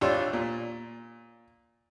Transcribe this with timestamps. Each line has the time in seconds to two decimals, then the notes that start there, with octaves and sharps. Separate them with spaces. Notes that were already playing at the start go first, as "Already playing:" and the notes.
0.01 G#1 D4 F4 G4 C#5 E6
0.33 A#2